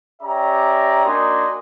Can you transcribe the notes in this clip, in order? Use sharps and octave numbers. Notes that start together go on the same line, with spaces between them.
C#4 G4 D5 E5 A#5
A#3 D4 D#4 F#4 G#5 C6